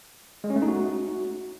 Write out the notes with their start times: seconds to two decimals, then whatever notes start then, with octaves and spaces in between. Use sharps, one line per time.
0.44 G#3
0.50 C#4
0.56 A3
0.62 D#4
0.68 F#4